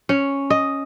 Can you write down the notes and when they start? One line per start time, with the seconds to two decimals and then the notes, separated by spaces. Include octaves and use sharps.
0.09 C#4
0.50 D#5